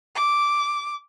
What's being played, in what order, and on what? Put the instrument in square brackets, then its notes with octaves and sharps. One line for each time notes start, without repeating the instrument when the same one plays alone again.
[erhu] D6